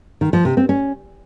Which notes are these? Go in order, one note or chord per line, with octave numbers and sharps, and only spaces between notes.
D#3
F3
C3
C4
C#4